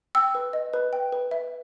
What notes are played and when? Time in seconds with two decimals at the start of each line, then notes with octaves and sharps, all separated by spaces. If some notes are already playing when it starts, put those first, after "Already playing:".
0.15 G5 E6
0.35 B4
0.53 D#5
0.73 B4
0.93 G5
1.12 B4
1.31 E5